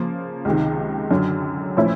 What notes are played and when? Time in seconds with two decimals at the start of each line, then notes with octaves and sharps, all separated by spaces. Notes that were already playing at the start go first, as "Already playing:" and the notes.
Already playing: C#3 F3 A#3
0.45 C#2 C3 D#3
1.11 F#2 D3 F#3
1.77 A#2 F3 A3 C#4 E4